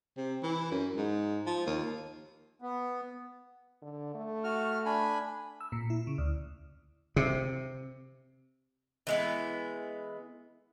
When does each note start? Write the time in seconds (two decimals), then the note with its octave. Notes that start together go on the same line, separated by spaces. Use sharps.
0.17 C3
0.43 E3
0.71 F#2
0.97 G#2
1.46 F3
1.66 D#2
2.62 B3
3.82 D3
4.14 A3
4.44 F#4 F6
4.86 D4 G#5 B5
5.61 E6
5.72 A#2
5.90 E4
6.07 C#3
6.18 D2
7.16 C3
9.07 E3 G#3 B3